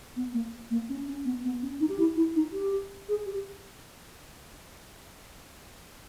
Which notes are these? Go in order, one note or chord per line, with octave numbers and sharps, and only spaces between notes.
B3
A#3
A#3
C#4
C#4
B3
B3
C#4
D#4
G4
E4
E4
D#4
G4
G#4
G4